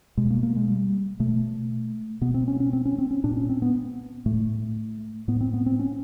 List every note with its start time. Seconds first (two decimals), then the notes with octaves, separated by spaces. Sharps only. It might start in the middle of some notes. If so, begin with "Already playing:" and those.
0.17 B2 G#3
0.30 A#3
0.43 A#3
0.56 G#3
0.68 G3
1.20 B2 A3
2.21 B2 B3
2.34 C4
2.48 C#4
2.60 C#4
2.73 C4
2.85 C#4
2.98 C4
3.11 C#4
3.24 A#2 D4
3.37 C#4
3.49 C4
3.62 B3
4.26 A2 A3
5.28 A2 B3
5.41 C4
5.53 B3
5.66 C4
5.79 C#4